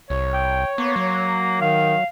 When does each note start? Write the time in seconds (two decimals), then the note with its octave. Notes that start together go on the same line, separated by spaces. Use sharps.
0.10 C2 C#5
0.34 G5
0.78 A#3 B3
0.96 F#3
1.61 D#3 F5